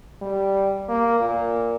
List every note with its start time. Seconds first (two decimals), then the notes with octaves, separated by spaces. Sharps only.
0.21 G3
0.88 A#3
1.20 A#2